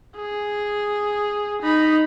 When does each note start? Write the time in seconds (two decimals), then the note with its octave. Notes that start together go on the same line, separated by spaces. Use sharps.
0.16 G#4
1.62 D#4 B5